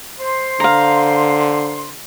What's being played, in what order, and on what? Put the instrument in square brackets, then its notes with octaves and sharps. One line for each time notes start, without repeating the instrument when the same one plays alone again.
[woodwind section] C5 C6
[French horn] D3 [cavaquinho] F5 A#5